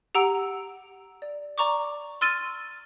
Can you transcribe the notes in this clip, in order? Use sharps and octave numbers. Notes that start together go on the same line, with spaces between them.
G4 F#5 A#5 E6 D7
D5
D5 A#5 C#6 D6
C6 E6 F6 A6 D#7 G7